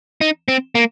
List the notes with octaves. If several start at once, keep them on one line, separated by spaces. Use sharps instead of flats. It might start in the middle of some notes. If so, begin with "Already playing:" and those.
D#4
C4
A#3